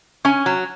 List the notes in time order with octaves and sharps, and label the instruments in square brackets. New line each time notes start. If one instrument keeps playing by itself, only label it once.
[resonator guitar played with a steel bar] C#4 G#5
F#3